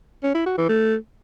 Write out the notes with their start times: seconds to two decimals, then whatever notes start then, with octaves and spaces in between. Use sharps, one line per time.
0.23 C#4
0.35 E4
0.46 F#4
0.57 E3
0.69 A3